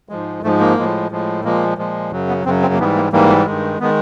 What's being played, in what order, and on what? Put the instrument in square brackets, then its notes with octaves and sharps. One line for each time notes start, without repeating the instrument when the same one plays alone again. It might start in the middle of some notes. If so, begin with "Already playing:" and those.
[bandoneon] G#2 F3 G#3
G#2 F3 G#3 A3
A#3
A2 F3 G#3
A2 F3 G#3
A#2 F3 G#3 A#3
A#2 F3 G#3
F#2 C#3 F#3
B3
F#2 C#3 F#3 C4
C4
A#3
G#2 E3 G3 B3
A#3
G#2 E3 G3 A#3
G2 D#3 G#3
D#3 G#3 B3